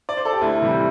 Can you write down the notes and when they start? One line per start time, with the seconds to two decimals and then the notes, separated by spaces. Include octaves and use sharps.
0.09 D5
0.17 C5
0.25 A4
0.33 G4
0.41 D2 E4
0.62 C3 E3 G3